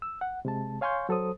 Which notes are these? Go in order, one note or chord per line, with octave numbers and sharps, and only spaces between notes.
E6
F#5
C3 G#3 A5
C#5 F5 G#5 C6 C#6 G6
F#3 A4 C5 D#6